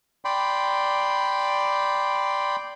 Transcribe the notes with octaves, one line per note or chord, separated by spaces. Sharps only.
D5 G5 B5 C6